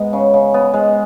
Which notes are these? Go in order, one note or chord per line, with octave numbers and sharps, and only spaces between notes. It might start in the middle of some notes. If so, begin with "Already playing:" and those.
Already playing: G#2 G#3 B3
C#3
C#3
B3
G#3